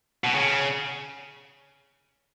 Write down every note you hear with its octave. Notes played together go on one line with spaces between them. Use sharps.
B2
C#3